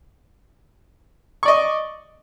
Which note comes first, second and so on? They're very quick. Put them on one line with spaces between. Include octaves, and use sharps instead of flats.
C#6 D5 D#5